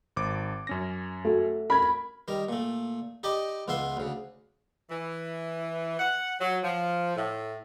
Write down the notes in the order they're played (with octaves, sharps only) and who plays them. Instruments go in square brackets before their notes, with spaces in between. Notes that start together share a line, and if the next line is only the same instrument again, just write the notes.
[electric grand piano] G#1 D6
F#2 C#4 A#6
[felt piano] A3 F#4
[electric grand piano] A#4 G#6 [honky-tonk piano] B5
[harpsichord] D#3 G3 A#4
A#2 A3
D#4 G4 D5 D#5 B5 D6
C#2 B3 F4 E5 C6
D2 C#3
[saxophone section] E3
F#5
F#3
F3
A2